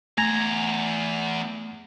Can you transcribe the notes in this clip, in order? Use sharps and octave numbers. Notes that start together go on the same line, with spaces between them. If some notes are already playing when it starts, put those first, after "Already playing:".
E2 A3 G#5 A#5 G#6 A#6